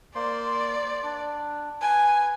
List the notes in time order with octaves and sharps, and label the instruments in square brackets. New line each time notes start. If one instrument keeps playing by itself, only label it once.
[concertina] A#3 C5 C6 [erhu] D5
[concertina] D4
[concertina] B4 [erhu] G#5